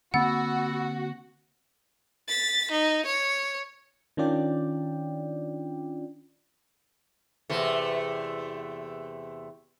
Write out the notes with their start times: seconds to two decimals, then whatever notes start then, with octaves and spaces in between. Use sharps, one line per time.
0.14 D3 A#3 C4 F#4 F#5 B5 E6 A6
2.27 A6 B6
2.71 D#4
3.05 C#5
4.17 D#3 C#4 D4 F4 D5 G5
7.50 E2 C3 A3